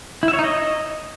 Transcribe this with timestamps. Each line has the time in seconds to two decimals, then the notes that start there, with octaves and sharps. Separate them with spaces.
0.23 E4
0.28 E5
0.33 C#5
0.39 D#4
0.44 D#5